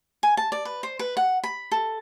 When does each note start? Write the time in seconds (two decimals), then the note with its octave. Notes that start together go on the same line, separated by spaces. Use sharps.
0.23 G#5
0.37 A5
0.52 D5
0.65 B4
0.83 C5
0.99 B4
1.17 F#5
1.44 B5
1.72 A4